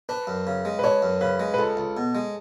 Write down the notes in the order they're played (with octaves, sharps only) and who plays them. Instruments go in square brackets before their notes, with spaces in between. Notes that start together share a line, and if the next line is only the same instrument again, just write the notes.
[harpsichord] D4 [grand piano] B4
[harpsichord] F#2
C#3
G#3
[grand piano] B4
[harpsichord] D4 [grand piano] C#5
[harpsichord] F#2
[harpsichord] C#3 [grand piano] B4
[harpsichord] G#3
[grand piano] B4
[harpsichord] C#2 [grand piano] A4
[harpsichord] C#2
B2
G#3